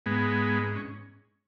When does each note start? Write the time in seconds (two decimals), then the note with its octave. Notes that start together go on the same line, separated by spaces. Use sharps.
0.06 G#2 G#3 B3
0.76 C#4